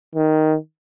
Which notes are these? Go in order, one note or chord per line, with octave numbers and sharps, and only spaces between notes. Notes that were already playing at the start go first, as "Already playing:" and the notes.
D#3